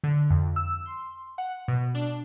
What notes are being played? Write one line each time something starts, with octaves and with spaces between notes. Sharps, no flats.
D3
F2
E6
C6
F#5
B2
D4